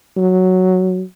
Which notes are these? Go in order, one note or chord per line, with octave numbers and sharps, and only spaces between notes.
F#3